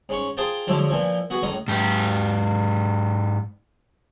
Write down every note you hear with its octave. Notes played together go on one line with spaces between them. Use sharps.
G#2 C#4 C#6
F4 G#4 C5 G5 A5
D3 F3 F#3 G#3 E4
A#2 E3 F3
B3 F#4 G#4 G#5
C#2 A2 D#5 A#5
G#2 G4